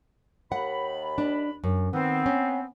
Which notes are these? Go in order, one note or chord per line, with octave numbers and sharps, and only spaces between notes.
D#2 F#5 B5
D4
F#2
D#3 B3 C4
C#4